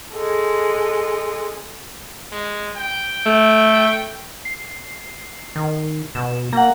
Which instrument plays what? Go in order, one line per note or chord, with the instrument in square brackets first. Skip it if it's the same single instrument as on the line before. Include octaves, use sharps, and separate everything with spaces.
[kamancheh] G#3 A4
[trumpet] G#3
G5
[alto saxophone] A3
[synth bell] C7
[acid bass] D#3
[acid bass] B2 [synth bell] E7
[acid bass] A#3 [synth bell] F#5 A#5